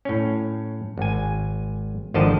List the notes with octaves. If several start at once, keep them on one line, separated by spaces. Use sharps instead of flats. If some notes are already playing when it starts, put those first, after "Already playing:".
A2 C#4
G#1 G#5
G#1 D3 D#3 F3 D#5 A5